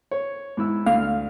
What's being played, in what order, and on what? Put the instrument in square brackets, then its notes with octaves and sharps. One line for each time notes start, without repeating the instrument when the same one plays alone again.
[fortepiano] C#5
G#2 E4 E6
[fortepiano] D2 [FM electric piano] F5 F6